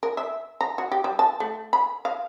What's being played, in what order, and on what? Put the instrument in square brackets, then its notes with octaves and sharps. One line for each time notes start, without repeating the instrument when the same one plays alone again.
[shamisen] A#4
E5
A#5
F#4
G4
G3
A5
A3
B5
F5